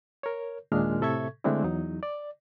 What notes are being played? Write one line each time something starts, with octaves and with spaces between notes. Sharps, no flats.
A#4 C#5
D#2 A#2 G#3 D4 F6
A2 C3 A4 E5 C#6 G#6
D3 G#3 A3 C4 D4 E4
E2 F#3 D#4
D5